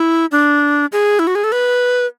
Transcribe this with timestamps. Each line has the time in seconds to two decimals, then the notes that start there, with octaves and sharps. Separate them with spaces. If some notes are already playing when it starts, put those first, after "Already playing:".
Already playing: E4
0.32 D4
0.92 G#4
1.19 E4
1.27 F#4
1.35 G#4
1.44 A4
1.52 B4